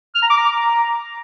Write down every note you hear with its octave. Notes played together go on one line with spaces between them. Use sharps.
F6
A#5
D6
A#5